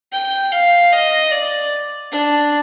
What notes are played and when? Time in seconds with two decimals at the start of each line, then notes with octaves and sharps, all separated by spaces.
0.12 G5
0.52 F5
0.92 D#5
1.31 D5
2.12 D4